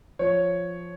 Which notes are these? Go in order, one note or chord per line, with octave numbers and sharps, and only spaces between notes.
F3 C#5